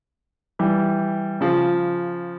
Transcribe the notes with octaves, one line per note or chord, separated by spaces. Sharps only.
E3 G3
C#3 F3